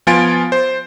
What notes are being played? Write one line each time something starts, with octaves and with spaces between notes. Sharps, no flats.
F3 B3 F4 G#5 A6 D7
C5